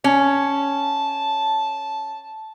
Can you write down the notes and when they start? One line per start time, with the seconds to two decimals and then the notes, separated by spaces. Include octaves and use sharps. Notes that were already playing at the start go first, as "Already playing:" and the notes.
0.04 C#4 A5